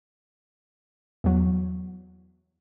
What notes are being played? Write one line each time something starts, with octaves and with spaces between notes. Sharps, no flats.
E2 F#3